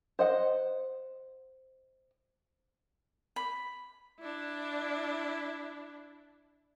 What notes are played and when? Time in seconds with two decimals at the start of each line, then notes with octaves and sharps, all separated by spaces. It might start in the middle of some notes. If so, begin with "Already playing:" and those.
0.19 C5 D#5 F#5
3.36 B5
4.20 D4 E4